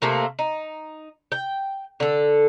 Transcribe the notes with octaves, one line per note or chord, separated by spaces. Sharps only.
C3 A3 A#3
D#4
G5
D3 A4